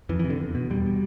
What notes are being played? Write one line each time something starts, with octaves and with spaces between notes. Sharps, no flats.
F2 E3
E3
C3
D3
E2
B2
E2 G3
B2